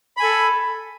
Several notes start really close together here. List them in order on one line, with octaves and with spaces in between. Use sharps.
B5 G#5 A4